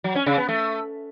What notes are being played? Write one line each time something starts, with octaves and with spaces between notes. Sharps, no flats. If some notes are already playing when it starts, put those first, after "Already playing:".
F#3
C#4
C#3
B3
A3